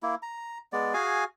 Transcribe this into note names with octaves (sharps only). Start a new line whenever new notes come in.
A#3 E4
A#5
G#3 B3 D5
F#4 G#4 F5 G#5